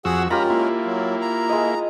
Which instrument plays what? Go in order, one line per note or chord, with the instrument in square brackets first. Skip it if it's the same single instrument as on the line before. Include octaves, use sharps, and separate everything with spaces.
[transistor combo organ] F2 F#4 E6 [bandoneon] G#4 F#5
[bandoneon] G#3 C#4 A#4 [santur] F4 G4 [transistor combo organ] A#5 B5
[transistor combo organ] A#3 E4
[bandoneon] F#3
A#5
[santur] G#3 D#5